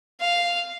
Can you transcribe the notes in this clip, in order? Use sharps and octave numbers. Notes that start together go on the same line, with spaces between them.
F5